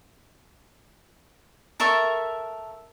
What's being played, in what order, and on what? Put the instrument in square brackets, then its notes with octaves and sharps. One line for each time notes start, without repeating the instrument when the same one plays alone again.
[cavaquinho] A4 A#4 E5 C#6